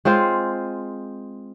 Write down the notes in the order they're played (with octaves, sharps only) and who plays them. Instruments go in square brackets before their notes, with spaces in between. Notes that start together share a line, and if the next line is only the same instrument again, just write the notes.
[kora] G#3 C4 F4 C5